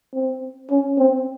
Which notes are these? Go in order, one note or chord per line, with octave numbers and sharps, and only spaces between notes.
C4
C#4
C4